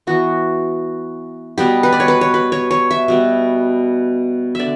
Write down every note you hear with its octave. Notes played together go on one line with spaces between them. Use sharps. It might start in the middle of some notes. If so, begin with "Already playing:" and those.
E3 B3 F#4
B2 G3 B3 G4
B4
D5
C#5
B4
C#5
B4
C#5
C#5
E5
B2 G3 B3
D3 D5 E5